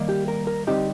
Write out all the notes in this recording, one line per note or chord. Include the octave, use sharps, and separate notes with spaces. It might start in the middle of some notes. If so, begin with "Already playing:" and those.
Already playing: D#3 G3 A#3
G4
A#4
A#4
D3 G3 C4 D#4 G4